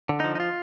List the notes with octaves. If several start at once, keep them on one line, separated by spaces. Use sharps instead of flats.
D3
F3 D#4
D#4
F4